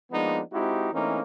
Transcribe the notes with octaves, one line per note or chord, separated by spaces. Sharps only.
F3 G#3 A#3 B3 D4 D#4
G#3 C4 D#4 E4 F#4 G4
E3 A3 A#3 C4 C#4 D#4